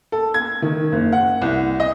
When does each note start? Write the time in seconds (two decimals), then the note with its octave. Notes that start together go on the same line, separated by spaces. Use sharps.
0.12 A4
0.34 G#6
0.62 D#3
0.92 F#1
1.12 F#5
1.42 C2
1.80 D#5